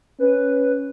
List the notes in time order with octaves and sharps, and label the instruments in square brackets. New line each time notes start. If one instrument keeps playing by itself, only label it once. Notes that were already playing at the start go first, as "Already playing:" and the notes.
[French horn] C#4 [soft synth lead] B4